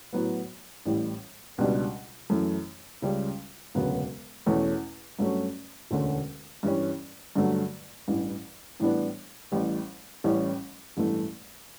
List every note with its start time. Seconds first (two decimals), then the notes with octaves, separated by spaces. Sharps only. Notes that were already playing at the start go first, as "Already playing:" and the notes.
0.13 A2 F#3 B3
0.86 A1 A2 G3
1.58 C#2 B2 G3 D4
2.30 F#2 E3 A3
3.02 C#2 C#3 G3
3.75 E1 D2 C#3 F#3 B3
4.46 E2 B2 A3 C#4
5.19 G2 F#3 A3 C#4
5.91 E1 D2 D3 A3 C#4
6.63 G2 E3 G3 C#4
7.36 G2 D3 F#3 A3
8.08 A1 G2 E3
8.80 A2 E3 G3 B3 D4
9.52 A1 A2 G3
10.24 A1 A2 G3 C#4
10.97 A1 G2 E3 A3